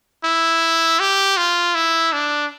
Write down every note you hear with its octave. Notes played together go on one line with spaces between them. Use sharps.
E4
G4
F4
E4
D4